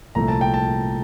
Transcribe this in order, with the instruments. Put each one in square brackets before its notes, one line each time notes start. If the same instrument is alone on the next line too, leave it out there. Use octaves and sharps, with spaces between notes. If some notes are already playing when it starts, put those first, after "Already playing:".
[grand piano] C2 A#2 F3 A3 A#5
A5
G5
A5